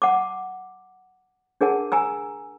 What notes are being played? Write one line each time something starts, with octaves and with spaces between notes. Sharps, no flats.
F#5 A5 D6
D4 G#4 A#4 F#5 A5
G#5 A#5 E6